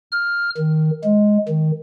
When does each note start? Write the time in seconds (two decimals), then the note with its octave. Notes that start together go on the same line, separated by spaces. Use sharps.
0.12 F6
0.58 D#3
1.04 G#3
1.49 D#3